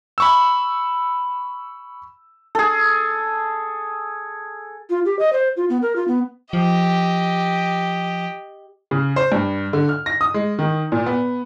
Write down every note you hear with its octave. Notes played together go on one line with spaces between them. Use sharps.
B5 C#6 E6
G#4 A4
F4
G4
D#5
C5
F4
B3
A#4
F4
B3
F3 G4 D#5
C#3
C5
G2
D3
F6
A#6
D#6
G#3
D#3
A#2
B3